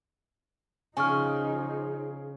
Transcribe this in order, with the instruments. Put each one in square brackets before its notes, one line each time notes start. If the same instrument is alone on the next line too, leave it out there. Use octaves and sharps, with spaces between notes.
[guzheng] C#3 [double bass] F3 D#4 [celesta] G#5 C#6 F6